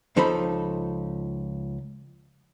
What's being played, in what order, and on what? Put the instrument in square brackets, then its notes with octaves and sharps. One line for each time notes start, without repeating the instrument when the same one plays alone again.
[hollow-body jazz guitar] C#2 F3 D#4 A4 C5 B5